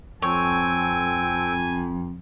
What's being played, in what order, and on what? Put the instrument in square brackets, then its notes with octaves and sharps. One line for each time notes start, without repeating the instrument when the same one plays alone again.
[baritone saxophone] F2 [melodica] C4 A4 G5 [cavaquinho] C#5 [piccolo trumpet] G#5